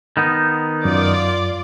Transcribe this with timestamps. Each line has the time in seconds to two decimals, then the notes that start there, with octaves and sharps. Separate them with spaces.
0.17 D#3 B3 D#4
0.85 F#2 F4 D5 D6